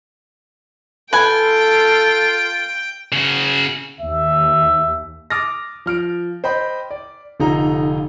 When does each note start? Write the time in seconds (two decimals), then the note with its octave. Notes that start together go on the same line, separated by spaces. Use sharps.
1.13 F4 A4 B4 G5 G#5
3.12 C#3 F#4
4.00 D#2 E5
5.30 D6 D#6 F6 A6 A#6
5.86 F3 F6 D7
6.44 C5 D#5 G5 B5
6.91 D5
7.40 F1 D3 D#4 F4 A#5